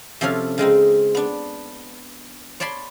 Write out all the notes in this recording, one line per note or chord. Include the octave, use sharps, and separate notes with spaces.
C3 F3 C#4 A4 C#5 F5
C#3 G#3 C4 D#4
B3 D4
C#5 D5 A5 B5 C6